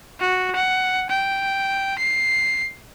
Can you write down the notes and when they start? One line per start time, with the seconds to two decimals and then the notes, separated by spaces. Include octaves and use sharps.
0.20 F#4
0.56 F#5
1.10 G5
1.99 C7